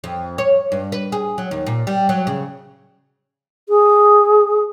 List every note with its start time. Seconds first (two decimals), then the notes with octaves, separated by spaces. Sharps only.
0.04 F2
0.38 C#5
0.72 G2
0.92 B4
1.12 G#4
1.38 F#3
1.51 D#2
1.66 A#2
1.87 G3
2.09 F#3
2.27 C#3
3.69 G#4